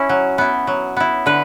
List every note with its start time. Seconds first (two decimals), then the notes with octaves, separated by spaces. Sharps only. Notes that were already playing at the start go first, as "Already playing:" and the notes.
Already playing: C#4 E4
0.09 F#3
0.38 B3 E4
0.67 F#3
0.97 B3 E4
1.26 D3 B4